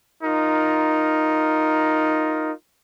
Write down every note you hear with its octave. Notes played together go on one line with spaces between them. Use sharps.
D#4 F4 A#4